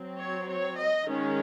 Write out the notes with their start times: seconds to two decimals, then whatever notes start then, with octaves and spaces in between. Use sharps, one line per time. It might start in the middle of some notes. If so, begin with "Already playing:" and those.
Already playing: F#3 C4
0.19 C#5
0.48 C#5
0.77 D#5
1.05 D#3 G#3 C#4